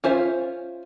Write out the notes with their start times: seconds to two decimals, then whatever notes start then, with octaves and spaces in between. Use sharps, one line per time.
0.04 C#4 F4 C5 E5